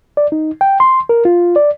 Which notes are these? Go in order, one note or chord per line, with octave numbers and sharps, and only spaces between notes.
D5
D#4
G5
C6
A#4
F4
D5